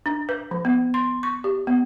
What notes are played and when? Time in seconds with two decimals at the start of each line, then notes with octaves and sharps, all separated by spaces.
0.06 D4
0.29 B4
0.51 F3
0.65 B3
0.94 C6
1.23 C#6
1.44 G4
1.67 B3